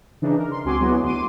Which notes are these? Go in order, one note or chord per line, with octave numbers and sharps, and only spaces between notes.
C#3 E3 D4 D#4
A#4
C6
C#2 C4 F#4 G#5 C6 D6
F#3 G#3 B3 E4 F#4
D2 C6 D6 D#7